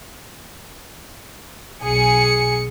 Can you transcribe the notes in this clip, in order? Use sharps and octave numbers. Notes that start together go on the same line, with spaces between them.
B1 G#4 C#7